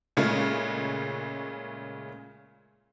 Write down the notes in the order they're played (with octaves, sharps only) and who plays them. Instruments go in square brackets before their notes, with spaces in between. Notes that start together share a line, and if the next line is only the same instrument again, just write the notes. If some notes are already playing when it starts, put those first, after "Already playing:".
[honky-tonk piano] A#2 C#3 G#3 A3 F4